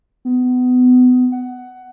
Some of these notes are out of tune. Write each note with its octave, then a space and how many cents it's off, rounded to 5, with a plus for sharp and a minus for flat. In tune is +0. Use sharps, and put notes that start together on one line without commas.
B3 +25
F#5 +15